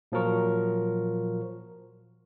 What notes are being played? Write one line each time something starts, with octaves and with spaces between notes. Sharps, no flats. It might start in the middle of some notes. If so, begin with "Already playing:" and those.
A#2 F3 F#3 A#4 C#6